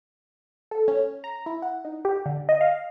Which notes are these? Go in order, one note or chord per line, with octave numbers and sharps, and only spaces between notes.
A4
C#4
A#5
E4
F#5
D#4
G4
D3
D#5
F5